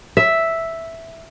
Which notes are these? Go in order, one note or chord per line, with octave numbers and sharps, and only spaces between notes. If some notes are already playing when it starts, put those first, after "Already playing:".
E5